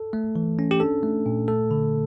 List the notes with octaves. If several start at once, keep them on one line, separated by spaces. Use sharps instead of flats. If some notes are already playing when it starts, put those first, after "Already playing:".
Already playing: A4
A3
E3
C#4
G4
D4 A4
A3
A#2
A3 A4
D3